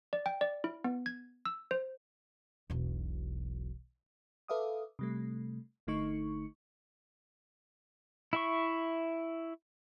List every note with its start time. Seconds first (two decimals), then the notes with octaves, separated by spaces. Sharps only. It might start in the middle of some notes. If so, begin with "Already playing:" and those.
0.13 D5
0.26 G5
0.41 D5
0.64 E4
0.84 B3
1.06 G#6
1.45 E6
1.71 C5
2.70 E1 B1
4.48 A4 B4 E5 F5 D6 D#6
4.99 C3 G3 A3
5.87 G1 D3 A3 D#4 C#6 C#7
8.33 E4 E5 C#6